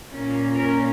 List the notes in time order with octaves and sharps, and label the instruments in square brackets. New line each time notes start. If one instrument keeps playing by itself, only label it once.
[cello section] A#2 A#3 C#4
A#4